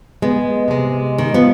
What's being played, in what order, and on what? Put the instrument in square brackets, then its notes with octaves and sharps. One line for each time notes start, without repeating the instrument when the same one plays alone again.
[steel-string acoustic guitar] G#3 [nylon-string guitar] B3
[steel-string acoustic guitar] C3 G#3
[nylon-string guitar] D#3
[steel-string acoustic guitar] F3 [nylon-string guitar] B3